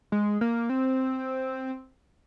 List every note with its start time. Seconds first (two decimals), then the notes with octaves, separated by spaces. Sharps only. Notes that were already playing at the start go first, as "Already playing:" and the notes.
0.12 G#3
0.41 A#3
0.70 C4